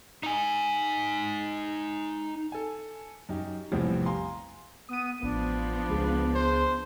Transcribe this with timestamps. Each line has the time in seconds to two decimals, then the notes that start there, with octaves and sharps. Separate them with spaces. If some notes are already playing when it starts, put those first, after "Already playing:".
0.23 D#4 G#5
2.52 A4 G#5
3.29 F#2 D#4 G4
3.72 A1 E2 A2 C3 F3 G3
4.06 F5 G#5 A#5 C6
4.89 B3 D#6 D#7
5.23 A1 F3 B3 D4
5.89 C#2 G#4
6.35 C5